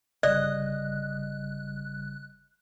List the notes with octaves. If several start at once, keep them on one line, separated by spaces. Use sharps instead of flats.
G1 C#3 G3 D5 D#5 F#6